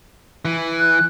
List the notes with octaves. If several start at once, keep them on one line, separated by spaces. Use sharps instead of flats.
E3
F#6